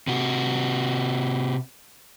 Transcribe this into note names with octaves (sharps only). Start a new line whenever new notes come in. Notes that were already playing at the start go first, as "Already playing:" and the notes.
C3 F#4